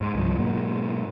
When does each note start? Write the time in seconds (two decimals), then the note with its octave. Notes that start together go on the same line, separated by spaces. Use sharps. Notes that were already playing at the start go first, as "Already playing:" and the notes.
0.01 G#2 G#3
0.15 C2 G2 D3 F3
0.39 G#2 B2 F#3 A#3